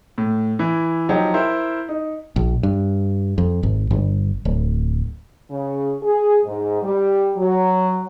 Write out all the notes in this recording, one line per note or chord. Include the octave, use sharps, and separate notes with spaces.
A2
E3 E4
F3 F#3 D#4 G4
E4 A#4 C5 E5
D#4
A#1
G2
F2
G#1
G1
D1
C#3
G#4
G#2
G3
F#3